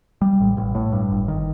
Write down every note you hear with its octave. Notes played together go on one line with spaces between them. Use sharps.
G3
A1
A1
A2
G2
G1
D#3